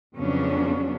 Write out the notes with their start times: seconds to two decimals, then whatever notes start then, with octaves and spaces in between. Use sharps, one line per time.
0.16 F2 C#3 F#3 B3 C#4 D4